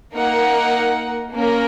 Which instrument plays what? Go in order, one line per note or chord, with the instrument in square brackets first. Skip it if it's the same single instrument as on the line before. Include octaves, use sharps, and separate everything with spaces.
[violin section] A#3 D#4 A#4 F#5
A#3 C#4 A#4